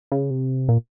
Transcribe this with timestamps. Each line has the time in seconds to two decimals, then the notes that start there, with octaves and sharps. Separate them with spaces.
0.12 C#3
0.30 C3
0.69 A#2